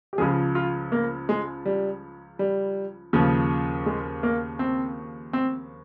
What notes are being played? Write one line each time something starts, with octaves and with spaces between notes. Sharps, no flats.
G4
C#2 C#3 F3 G#4
F4
A#3
G#3
G3
G3
D#2 C#3 F3
G#3
A#3
C4
C4